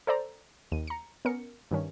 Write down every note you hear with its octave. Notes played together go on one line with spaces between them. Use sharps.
A4 C5 D5 A#5
D#2 D#7
A#5 C#7
B3 C#4 A#4 C#7
G2 D#3 C#4